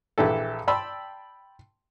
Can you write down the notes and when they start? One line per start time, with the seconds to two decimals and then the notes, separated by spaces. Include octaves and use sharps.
0.18 A#1 E3 E4 G4 A4
0.67 D5 G5 A5 B5 C6 E6